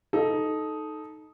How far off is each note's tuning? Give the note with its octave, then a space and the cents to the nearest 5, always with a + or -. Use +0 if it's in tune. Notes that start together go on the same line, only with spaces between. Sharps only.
D#4 +0 A4 -15